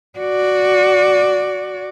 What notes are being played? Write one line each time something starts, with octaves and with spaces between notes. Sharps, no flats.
F#4 D5